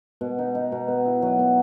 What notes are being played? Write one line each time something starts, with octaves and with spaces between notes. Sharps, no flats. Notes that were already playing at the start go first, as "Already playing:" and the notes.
B2
D#4
D#4
B2
B3
E4
F#3
B3